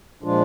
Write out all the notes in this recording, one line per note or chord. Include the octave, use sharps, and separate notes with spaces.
A#2 F3 G#3 D4 F4